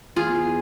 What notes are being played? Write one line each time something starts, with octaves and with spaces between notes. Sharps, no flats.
E2 F4 G#4